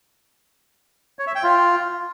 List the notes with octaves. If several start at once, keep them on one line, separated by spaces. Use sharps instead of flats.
C#5
E5
G5
F4